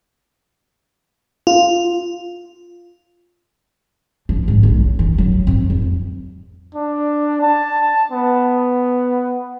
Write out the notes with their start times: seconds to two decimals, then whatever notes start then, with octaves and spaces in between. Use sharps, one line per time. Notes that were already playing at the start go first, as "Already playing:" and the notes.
1.47 F4
4.29 F3
4.48 G#1
4.63 B1
4.81 C#3
4.99 E3
5.18 F#3
5.47 F2
5.70 F2
6.75 D4
7.42 A5
8.12 B3